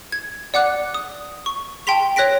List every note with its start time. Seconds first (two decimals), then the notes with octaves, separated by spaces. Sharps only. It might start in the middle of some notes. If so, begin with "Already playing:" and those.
0.12 G#6
0.54 D5 F#5 D6 F#6
0.94 D#6
1.46 C#6
1.87 G5 A5 C6 B6 F7
2.16 C#5 F#6 A#6 B6 D7